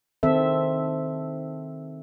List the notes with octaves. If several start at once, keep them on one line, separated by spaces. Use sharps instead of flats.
D#3 C4 A4 E5